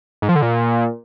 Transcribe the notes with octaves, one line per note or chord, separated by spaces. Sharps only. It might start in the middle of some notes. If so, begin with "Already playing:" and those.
G#2
F3
D3
A#2